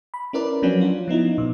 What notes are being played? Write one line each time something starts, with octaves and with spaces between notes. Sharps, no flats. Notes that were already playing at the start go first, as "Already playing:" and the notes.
B5
C#4 E4 A#4 B4 D5
F3 F#3 C#4 D4 F#4
F4
F3 B3 D#4 E4
B2